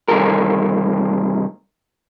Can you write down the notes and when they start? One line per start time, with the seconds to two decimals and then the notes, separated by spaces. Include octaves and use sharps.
0.08 C2 G2 D#3 A4 A#4